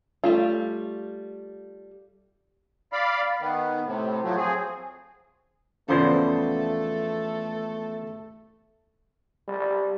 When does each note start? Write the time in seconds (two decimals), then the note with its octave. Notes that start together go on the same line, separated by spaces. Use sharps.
0.24 G3 A3 F4
2.93 D5 F5 B5
3.40 D#3 B3
3.86 A2 C3
4.23 F3 F#3 A3
4.37 C4 G#4
5.89 E2 C#3 F3 A3 B3 A4 C5 D5
9.48 G3